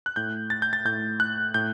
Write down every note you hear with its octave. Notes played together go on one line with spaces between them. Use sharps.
F#6
A2 G6
A6
G6
A6
A2 G6
F#6
A2 G6